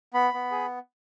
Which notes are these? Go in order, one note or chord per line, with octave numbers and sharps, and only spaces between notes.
B3 B5
B3
G#4